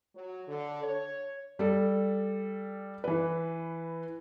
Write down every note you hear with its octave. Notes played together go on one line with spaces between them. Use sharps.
F#3
D3
C#5
G3 A4
E3 B4